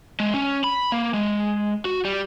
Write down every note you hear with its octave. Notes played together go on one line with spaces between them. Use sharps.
G#3
C#4
B5
A#3
G#3
F#4
G3